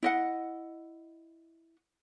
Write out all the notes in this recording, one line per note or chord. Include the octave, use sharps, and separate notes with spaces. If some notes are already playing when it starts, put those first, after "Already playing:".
E4 D#5 F#5